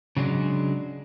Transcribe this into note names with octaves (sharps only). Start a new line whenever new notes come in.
C#3 F#3 G#3 D4